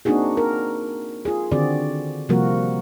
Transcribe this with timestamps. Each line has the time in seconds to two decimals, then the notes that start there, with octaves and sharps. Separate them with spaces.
0.05 A#3 C4 D4 D#4 F#4 G#4
0.37 A#4
1.25 F4 G#4
1.51 D3 D#3 C4 F#4 G#4 D5
2.29 C3 F3 G3 A#3 F#4 A#4